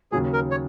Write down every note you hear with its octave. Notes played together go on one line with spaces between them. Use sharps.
D#2 C#3 F#3 G#4
A#4
C#5